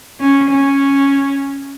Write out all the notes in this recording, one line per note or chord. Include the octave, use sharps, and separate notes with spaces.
C#4
C#4